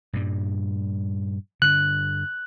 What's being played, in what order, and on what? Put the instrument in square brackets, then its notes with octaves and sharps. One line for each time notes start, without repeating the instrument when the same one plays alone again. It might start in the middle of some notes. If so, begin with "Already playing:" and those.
[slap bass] G2 A#2 G3
[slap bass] G2 D3 [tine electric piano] F#6